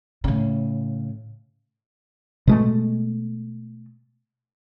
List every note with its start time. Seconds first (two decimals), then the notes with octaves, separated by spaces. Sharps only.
0.24 A2 C#3
2.47 B2 G#3 A3